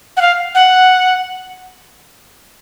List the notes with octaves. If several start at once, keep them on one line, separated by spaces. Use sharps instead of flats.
F#5
F5
F#5